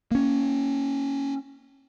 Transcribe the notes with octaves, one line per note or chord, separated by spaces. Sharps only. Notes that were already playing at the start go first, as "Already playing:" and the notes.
A#3 C#4